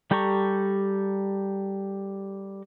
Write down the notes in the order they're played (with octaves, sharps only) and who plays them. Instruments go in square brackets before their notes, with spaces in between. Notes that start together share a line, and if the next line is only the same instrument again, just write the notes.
[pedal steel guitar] G3 G4 A4 A#5 C#6